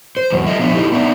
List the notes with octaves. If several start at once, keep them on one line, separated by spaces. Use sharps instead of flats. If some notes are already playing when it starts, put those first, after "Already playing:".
C5
E2 F#3
F4 A4 D#5 E5
F3 B3 D4 D5 E5
D#4 E4 G4 A4 D#5
B3 D4 D#4 E5